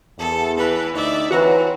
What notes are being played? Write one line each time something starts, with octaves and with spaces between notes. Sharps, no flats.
E2 A4
E3 B4
D2 D#4 D5 E5
E3 C4 F#4 B4 C#5 F#5 A#5